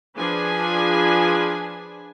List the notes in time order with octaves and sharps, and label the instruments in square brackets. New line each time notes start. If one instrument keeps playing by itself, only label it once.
[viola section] F3 D4 G#4 B4 G#5